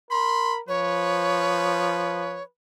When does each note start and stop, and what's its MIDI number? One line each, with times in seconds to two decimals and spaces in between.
0.11 0.60 70
0.11 0.60 83
0.11 0.53 84
0.68 2.41 53
0.68 2.48 71
0.68 2.43 73